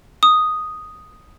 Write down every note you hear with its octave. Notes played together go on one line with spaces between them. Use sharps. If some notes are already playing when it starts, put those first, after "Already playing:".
D#6